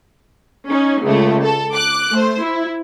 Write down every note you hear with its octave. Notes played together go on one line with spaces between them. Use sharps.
C#4 D#4
C#2 C#3 A3
A4
D6 F#6
A3 C5
E4